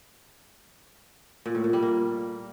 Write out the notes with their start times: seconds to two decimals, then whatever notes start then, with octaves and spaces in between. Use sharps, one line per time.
1.46 A#2
1.55 A2
1.64 A#2
1.73 G3
1.82 A#3